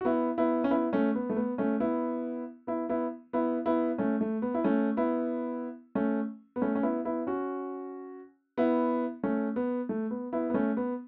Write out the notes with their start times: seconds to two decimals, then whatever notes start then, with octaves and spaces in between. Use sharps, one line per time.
0.01 F#4
0.05 B3 E4
0.38 B3 E4
0.64 C#4
0.71 B3 E4
0.93 A3 C#4
1.15 B3
1.30 A3
1.36 B3
1.58 A3 C#4
1.80 B3 E4
2.67 B3 E4
2.89 B3 E4
3.33 B3 E4
3.66 B3 E4
3.98 A3 C#4
4.21 A3
4.42 B3
4.54 E4
4.64 A3 C#4
4.97 B3 E4
5.95 A3 C#4
6.56 B3
6.62 A3 C#4
6.75 C#4
6.83 B3 E4
7.05 B3 E4
7.27 C#4 F#4
8.58 B3 E4
9.24 A3 C#4
9.56 B3
9.89 A3
10.11 B3
10.33 B3 E4
10.50 B3
10.54 A3 C#4
10.77 B3